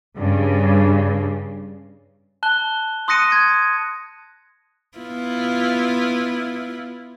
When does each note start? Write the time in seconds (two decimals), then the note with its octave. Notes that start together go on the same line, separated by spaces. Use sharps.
0.16 G2 C#3
2.43 A5 F#6 G7
3.08 C6 D#6 F#6 A#6 C#7 D#7
3.32 G#6
4.98 B3 E4 F4